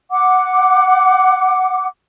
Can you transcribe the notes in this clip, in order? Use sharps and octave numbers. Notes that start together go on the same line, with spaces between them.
F#5 D6